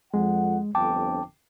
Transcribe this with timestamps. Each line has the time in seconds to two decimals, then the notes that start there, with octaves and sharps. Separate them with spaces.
0.14 F2 G#3 F#5
0.75 G1 F2 G5 A5 D6